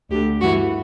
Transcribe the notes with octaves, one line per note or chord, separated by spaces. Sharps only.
D2 D3 G4
G2 E3 F#4